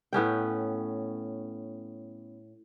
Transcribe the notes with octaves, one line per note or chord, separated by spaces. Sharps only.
A2 B3 C#4 G5